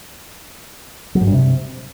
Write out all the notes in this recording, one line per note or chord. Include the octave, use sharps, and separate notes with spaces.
F#3
G#2
G2
C3